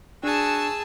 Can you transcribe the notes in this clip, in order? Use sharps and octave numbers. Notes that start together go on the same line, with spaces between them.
D4 F#4 G#4 A5 E6